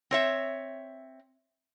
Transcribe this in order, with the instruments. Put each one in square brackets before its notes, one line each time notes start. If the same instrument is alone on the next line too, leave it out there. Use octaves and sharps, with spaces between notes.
[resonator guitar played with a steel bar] C4 C#5 E5